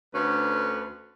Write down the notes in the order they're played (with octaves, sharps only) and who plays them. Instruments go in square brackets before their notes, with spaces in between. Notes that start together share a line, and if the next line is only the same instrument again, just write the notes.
[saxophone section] D2 D3 C#4 B4